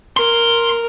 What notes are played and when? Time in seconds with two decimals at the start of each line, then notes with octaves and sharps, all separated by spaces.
0.17 A#4 C6